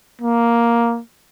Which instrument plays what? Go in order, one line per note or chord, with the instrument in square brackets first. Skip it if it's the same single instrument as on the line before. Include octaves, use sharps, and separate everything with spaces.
[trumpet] A#3